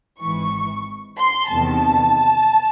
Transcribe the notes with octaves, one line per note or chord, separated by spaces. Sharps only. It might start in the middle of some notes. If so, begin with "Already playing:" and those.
G#1 G#2 E3 C#6
C6
E2 C3 D#3 A5